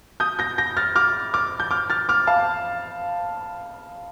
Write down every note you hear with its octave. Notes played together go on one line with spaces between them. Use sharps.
D#6 G6
G6 A#6
G6 A#6
F6 A6
D6 F6
D6 F6
G6
D6 F6
F6 A6
D6 F6
F5 A5